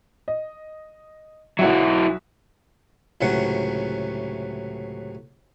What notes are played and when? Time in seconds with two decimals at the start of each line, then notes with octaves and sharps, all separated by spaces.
0.28 D#5
1.59 B1 F#3 E4 F#4 E5
3.21 C#2 A2 C3 E3 F#3 F#5